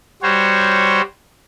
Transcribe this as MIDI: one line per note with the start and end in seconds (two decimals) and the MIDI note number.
0.22 1.01 55
0.22 1.01 66
0.22 1.01 72
0.22 1.01 73